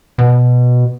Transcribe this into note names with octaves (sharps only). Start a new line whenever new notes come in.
B2